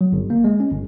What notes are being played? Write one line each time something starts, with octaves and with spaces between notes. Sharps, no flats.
F#3
G1
A#3
G#3
C#4
G1